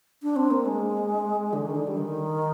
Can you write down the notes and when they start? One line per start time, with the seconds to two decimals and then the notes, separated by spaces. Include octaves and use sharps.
0.23 D4
0.36 C4
0.51 A#3
0.66 G#3
1.53 D3
1.65 D#3
1.75 D3
1.87 G3
1.97 D#3